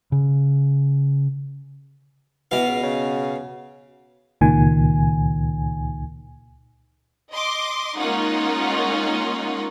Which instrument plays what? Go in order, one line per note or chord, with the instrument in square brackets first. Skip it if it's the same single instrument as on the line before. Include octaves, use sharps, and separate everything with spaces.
[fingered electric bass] C#3
[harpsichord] B2 F5 [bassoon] E3
[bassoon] C#2
C#3
[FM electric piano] C#2 A#2 D#3 G#5
[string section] D#5 C6 D6
G#3 A#3 C#4 D#4 F4 F#5